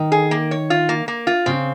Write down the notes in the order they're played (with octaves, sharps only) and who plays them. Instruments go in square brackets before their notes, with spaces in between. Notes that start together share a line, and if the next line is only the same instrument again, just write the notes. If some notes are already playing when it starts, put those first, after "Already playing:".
Already playing: [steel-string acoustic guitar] D#3
[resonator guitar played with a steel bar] G#4
A#3
C#5
F4
A#3
A#3
F4
[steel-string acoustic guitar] C#3 [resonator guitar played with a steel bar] C4